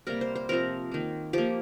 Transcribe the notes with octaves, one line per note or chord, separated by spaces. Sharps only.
C3 G3 A#3 A#4
C5
C5
C3 F3 C4 A#4
D#3 A#3
F3 A#3 G4